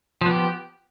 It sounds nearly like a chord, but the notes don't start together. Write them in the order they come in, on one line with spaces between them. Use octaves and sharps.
F3 B3 G4